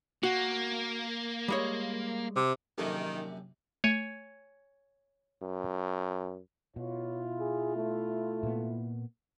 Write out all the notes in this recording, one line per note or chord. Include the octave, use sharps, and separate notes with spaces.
A#3 F#4
G3 G#3 C#5
C3
A#1 F#2 C3 D#3 G4 A4 A#4
A3 C#5 G#5
F#2
B2 E4 F4 C#5
G#4
A3
A#2 A#3 B3